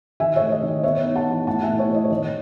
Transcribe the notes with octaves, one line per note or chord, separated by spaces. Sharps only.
D#3 E5 G#5
C#5 E5
A3
D#5
D#3
D#5
B3 C#5 E5
D#4
F#5 A5
E3
A2 F#5 A5
E5 G#5
A2
C#5
A2
D#5
C#5
D#3 D#5